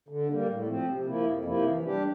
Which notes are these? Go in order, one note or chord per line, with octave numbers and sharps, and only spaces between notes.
D3
G3 A#3
A2
F3 C4
C3
F3 A#3 E4
F2
C3 F3 A#3 E4
E3
G3 D4 G4